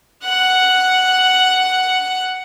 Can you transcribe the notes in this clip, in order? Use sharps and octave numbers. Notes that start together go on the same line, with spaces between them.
F#5 F#6